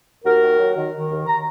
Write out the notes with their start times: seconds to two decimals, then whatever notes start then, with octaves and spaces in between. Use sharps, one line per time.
0.25 D#2 F#4 A#4
0.42 D#3
0.58 F#3
0.76 D#3
0.93 D#3
1.10 D#2
1.27 A#5